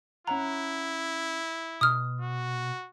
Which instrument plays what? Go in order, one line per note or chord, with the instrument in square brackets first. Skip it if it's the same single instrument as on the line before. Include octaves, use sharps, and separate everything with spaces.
[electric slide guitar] C#4 C#5 F#5 [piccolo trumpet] E4 [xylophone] A#5
[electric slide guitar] B2 [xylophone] D#6 F6
[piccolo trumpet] F#4